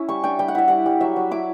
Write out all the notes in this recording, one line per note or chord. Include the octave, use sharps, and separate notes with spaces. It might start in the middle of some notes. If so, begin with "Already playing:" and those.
Already playing: C#4 E4
G3 C#6
D4 G5
G3 G5
F#5
E4 E5
G3 F#5
G3
F#3 E5
F#3
E4 D6